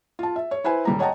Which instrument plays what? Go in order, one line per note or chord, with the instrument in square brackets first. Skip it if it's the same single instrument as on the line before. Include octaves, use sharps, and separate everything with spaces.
[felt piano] F4 A5
E5
C#5
E4 B4 C5 G#5
D#1 G3 A#5
C#5 D#5 F#5 G5 A5 A#5